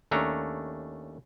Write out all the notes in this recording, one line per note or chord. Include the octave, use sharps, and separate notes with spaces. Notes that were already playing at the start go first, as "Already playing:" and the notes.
D#2 A3 C#4 D4 A#5